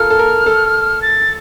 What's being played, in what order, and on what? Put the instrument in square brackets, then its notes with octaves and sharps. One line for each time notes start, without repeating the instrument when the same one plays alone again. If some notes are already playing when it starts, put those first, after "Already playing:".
Already playing: [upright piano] F4 A4 A#4 [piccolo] F6
[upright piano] A4
A#4
A4
[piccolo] A6